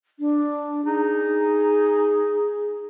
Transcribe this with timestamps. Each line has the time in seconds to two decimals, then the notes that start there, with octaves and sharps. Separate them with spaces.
0.19 D4
0.85 D#4 G#4